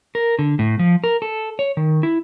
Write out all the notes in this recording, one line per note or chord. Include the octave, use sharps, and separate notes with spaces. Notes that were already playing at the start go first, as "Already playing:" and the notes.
A#4
D3
A2
F3
A#4
A4
C#5
D#3
E4